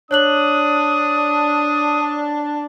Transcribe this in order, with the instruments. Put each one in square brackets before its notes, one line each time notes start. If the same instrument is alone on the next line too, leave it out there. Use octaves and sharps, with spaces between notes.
[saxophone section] D4 [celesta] C#5 F#6 F#7 [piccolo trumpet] D#6